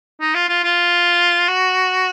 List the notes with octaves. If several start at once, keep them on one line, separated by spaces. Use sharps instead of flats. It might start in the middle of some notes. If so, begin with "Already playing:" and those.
D#4
F4
F4
F4
F#4